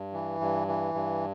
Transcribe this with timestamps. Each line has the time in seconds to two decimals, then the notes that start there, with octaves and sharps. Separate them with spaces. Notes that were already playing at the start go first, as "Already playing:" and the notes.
Already playing: G2
0.13 E3
0.40 G2
0.68 E3
0.94 G2